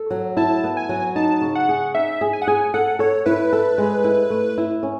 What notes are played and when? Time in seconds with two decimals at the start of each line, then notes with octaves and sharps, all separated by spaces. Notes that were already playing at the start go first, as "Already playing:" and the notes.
Already playing: A4
0.10 F#3
0.37 E4 A5
0.64 B3
0.77 G#5
0.89 F#3
1.16 D#4 A5
1.41 C#3
1.55 F#5
1.69 G#4
1.95 D#4 E5
2.21 G#4
2.33 G#5
2.42 F#5
2.47 G#4 G#5
2.74 A4 F#5
2.99 A4 C#5
3.26 E4 B4
3.53 A4
3.78 G#3
4.04 E4
4.30 A3
4.58 E4
4.83 C#4